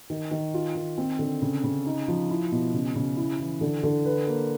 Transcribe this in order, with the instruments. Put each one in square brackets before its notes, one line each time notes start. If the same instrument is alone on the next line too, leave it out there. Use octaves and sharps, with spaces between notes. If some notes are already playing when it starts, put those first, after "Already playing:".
[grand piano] D#3
D#3
F4
D#3
C4
D3
C#3
C#3
D#4
F3
E4
B2
C#3
C#3
E4
E3
D3
D3
B4
A#3